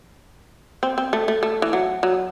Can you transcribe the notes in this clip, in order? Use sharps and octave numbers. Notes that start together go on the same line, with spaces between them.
C4
C4
A3
A3
A3
E3
F#3
F#3